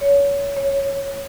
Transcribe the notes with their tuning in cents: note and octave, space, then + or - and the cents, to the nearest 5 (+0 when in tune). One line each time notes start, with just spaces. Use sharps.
C#5 +25
C#5 -5